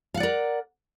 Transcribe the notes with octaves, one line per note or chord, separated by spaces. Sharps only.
A#4 D5 F5 F#5